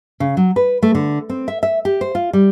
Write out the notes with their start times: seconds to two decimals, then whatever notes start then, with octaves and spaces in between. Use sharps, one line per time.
0.20 C#3
0.37 F#3
0.56 B4
0.83 A3
0.95 D3
1.30 C4
1.48 E5
1.63 E5
1.85 G4
2.01 C5
2.15 F4
2.33 G3